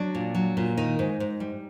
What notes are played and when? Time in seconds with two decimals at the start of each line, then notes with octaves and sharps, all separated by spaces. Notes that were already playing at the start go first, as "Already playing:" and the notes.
Already playing: F#3 D4
0.15 A#2
0.35 F#3
0.57 A#2
0.77 D#3 D#4
0.99 G#2
1.20 G#2
1.40 G3